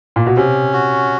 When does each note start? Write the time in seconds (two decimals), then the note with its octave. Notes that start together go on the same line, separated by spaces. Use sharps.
0.16 A#2
0.26 B2
0.37 C3 C#4
0.73 F#4